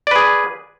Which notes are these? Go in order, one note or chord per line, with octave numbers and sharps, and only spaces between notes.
G#4 B4 D5